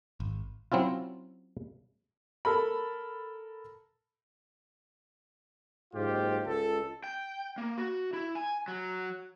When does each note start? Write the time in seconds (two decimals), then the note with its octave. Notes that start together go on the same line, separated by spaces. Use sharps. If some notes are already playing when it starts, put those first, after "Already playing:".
0.20 G#1
0.72 F#3 C4 C#4 E4 F4
2.45 A4 A#4 B5
5.94 F#1 G#2 F4 G4
6.47 C#2 A4
7.04 G5
7.58 A#3
7.78 F#4
8.13 E4
8.35 G#5
8.68 F#3